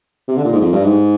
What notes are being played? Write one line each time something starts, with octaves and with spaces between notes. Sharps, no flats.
C3
D3
A#2
G#2
F2
G2
G#2